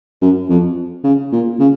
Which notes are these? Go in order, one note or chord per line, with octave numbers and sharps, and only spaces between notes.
F#2
F2
C#3
A#2
C#3